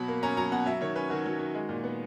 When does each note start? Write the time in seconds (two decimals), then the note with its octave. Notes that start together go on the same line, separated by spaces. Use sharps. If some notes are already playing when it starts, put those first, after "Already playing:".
Already playing: B2 F#3 B5
0.08 A#3
0.23 C#4 A#5
0.37 F#3 A#5
0.52 B2 F#5
0.66 F#3 E5
0.81 D#3 C#5
0.96 C#4 B4
1.10 D#3 F#4
1.26 F#3
1.39 D#3
1.55 G#3
1.69 A#2
1.84 B3